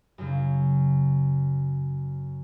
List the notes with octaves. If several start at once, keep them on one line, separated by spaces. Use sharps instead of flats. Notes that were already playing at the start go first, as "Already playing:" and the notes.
F#2 C#3